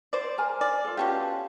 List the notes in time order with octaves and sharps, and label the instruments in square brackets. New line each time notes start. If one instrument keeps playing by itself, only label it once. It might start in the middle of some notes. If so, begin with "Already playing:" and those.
[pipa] C5 D5
[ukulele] A#4 G#5 A#5
[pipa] D5
[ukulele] F4 A4
[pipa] B2 C#4 F4 [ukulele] G4 A5